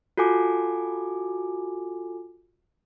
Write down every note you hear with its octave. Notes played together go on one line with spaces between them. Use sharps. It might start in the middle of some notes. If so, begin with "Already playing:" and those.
F4 F#4 A4 G#5 D6